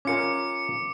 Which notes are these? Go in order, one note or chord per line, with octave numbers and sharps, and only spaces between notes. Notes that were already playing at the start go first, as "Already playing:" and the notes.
C#4 F4 A#4 D6 C#7